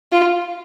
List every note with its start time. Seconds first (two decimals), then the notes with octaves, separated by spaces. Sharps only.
0.12 F4